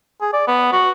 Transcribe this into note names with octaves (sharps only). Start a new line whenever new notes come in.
G#4
D5
B3
F#4